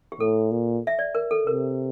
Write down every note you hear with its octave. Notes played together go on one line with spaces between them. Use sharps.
G4
A2 A4
A#2
E5
D5
A#4
A4
C3 A#4